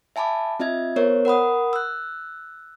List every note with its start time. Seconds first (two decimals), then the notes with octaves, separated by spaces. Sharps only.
0.16 E5 G#5 A5 B5 D6
0.60 C4 F4 D#5 E5 G#6
0.96 B3 A#4 C5 C#5
1.25 A#4 F#5 B5 D#6
1.73 E6 F#6